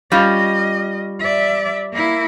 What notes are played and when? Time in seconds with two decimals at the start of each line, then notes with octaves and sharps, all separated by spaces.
0.12 G3 C#4 F4 D#5
1.20 D5 E5
1.93 A#3 E4